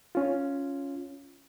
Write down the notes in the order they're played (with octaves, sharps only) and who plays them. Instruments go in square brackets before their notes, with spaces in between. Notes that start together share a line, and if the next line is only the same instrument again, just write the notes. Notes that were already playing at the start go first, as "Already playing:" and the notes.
[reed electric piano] C#4 F4